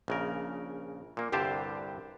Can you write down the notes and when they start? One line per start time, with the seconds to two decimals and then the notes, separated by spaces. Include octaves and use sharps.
0.08 A#1 C#3 A#4
1.17 A#2 A#3
1.32 C2 G2 D3 G4 C5 A5